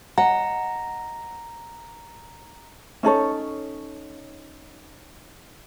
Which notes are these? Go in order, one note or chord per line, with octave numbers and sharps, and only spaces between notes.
D#5 F#5 A#5
C#4 D#4 A4 C#5